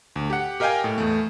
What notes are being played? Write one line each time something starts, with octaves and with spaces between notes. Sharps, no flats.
D2
G4 F#5
G4 A#4 D#5 F5 G5 G#5
A2
E2 A3